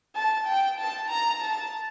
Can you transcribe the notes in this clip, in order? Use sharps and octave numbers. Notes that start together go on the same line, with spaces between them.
A5
G5
A5
A#5
A5